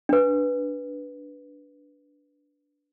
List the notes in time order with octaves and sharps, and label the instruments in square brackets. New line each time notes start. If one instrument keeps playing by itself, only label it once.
[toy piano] D4 B4